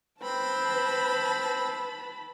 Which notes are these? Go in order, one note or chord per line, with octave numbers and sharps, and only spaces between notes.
C4 B4 A5 B5